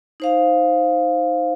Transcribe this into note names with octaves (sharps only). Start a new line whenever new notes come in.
D#4 C5 F5